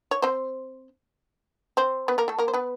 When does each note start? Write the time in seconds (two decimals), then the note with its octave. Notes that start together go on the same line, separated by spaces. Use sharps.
0.11 C#5
0.22 C4 C5
1.77 C4 C5
2.08 B3 B4
2.18 A#3 A#4
2.28 A3 A4
2.39 A#3 A#4
2.48 C5
2.54 B3 B4